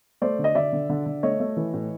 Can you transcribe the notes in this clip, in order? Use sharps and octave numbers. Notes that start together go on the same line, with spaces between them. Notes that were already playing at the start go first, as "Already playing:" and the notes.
A3 C5 D5
D3
D#5
D3 D5 E5
D3
D3
D3
A3 C#5 D#5
A3
E3
A2